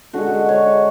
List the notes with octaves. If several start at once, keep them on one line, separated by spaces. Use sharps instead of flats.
D3 G#3 F#4
C#5